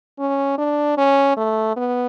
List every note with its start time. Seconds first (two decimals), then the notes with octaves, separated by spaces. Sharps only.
0.19 C#4
0.58 D4
0.97 C#4
1.37 A3
1.76 B3